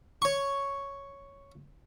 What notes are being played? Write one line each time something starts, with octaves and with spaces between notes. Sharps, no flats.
C#5 C#6